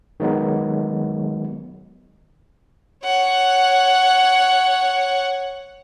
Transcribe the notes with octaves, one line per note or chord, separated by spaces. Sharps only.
D#3 F#3 G#3 B3 D#4
C#5 F#5